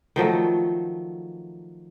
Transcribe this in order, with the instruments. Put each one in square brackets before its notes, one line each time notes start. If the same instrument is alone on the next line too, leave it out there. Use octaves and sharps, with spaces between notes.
[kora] D#3 F3 F#3 A3